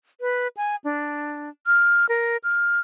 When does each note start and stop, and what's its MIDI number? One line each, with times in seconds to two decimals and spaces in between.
0.21 0.48 71
0.57 0.76 80
0.84 1.49 62
1.67 2.06 89
2.09 2.37 70
2.44 2.80 89